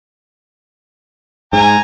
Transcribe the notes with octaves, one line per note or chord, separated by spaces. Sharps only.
G#2 G#5 A#5